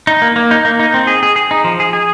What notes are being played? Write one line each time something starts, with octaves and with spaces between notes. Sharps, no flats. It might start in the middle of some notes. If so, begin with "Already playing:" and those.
D#4
A#3
A#3
D#4
A#3
D#4
C4
G#4
G#4
G#4
D#4
F3
G#4
G#4